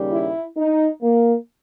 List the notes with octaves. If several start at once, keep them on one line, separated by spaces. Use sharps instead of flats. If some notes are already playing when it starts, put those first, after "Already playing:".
Already playing: D#2 C#3 G3
E4
D#4
A#3